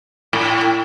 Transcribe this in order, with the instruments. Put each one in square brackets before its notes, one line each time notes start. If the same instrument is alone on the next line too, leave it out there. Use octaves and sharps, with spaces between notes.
[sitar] A2